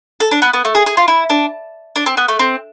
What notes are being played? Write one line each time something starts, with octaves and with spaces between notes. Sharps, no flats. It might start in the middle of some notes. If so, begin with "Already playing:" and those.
A4
D4
B3
B3
A3
G#4
G#4
F4
E4
D4
D4
C4
B3
A3
C4